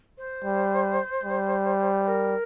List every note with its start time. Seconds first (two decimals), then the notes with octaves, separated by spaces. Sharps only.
0.18 C5
0.44 G3
1.24 G3
2.03 C5
2.07 A#4